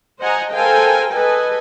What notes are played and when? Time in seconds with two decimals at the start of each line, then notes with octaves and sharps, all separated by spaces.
0.20 C5 D#5 F#5 G#5 A#5
0.52 A4 A#4 C5 F5 G5 G#5
1.12 A4 B4 D#5 G#5